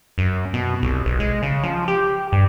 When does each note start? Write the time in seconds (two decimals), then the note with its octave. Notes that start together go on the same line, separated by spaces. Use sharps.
0.18 F#2
0.54 B2
0.83 C2
1.06 B1
1.20 G#3
1.43 C#3
1.63 F3
1.88 G4
2.32 G2